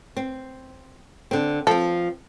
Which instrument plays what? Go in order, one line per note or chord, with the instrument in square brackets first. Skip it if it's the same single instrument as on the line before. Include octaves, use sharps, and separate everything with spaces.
[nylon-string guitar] C4
D3 C4
[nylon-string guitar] F3 C4 [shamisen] A4